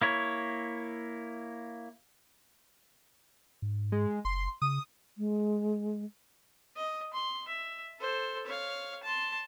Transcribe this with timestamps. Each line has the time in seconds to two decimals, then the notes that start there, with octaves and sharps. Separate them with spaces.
0.02 A#3 E4 C#5
3.62 G#2
3.92 G#3
4.25 F#1 C6
4.62 C#3 D#6
5.18 G#3
6.76 D#5
7.13 C6
7.48 E5
7.99 A4 C5
8.47 C#5 F5
9.03 A5 C6